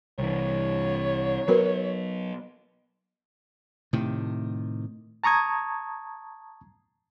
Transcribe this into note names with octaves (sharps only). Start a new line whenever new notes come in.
C2 E3 C#5
F#3 B3 F#4 A#4 B4
A2 C3 D#3
A5 A#5 C#6 D#6 G#6